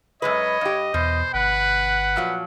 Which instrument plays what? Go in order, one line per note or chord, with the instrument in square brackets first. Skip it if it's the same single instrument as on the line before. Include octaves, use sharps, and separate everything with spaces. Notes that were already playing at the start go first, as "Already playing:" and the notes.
[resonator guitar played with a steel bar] F#2 G#3 B4 [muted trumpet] C#5 [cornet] D#5
[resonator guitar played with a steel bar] G2 G4
[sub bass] E2 [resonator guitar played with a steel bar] B2 [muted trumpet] C5
[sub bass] G1 [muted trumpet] B4 [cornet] F#5
[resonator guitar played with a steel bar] A#2 F3 F#3